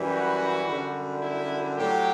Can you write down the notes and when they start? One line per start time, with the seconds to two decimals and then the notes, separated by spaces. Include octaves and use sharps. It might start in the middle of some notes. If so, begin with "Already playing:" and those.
Already playing: F#2 E3 G3
0.11 F#4
0.66 F#2 D3 G3
1.22 E4
1.78 A2 F#3 G4